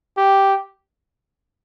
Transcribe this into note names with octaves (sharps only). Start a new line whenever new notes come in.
G4